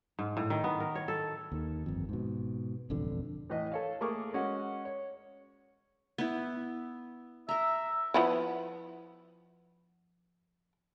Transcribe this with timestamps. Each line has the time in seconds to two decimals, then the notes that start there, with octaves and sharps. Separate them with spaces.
0.19 G#2
0.37 A2
0.50 D#3
0.64 B3
0.80 A#4
0.95 C#5
1.08 A4
1.52 D#2 D#3
1.86 G1 F2
2.09 G#2 B2
2.90 E1 A1 F2 D3
3.50 A2 E3 B4 D#5
3.72 A4 C#5 F5
4.01 A3 A#3 G#4 A#4 C#6 D6
4.33 G#3 C#4 F#4 F#5
4.85 C#5
6.18 B3 E4
7.49 A#4 E5 A#5
8.14 F3 B3 E4